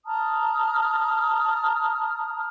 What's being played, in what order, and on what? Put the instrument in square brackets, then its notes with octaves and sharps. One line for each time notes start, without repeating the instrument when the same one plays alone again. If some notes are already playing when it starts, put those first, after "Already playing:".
[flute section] A5 A#5 D#6 F6